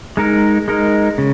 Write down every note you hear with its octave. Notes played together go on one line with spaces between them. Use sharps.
G#3 D#4 A#4
G#3 D#4 A#4
C#3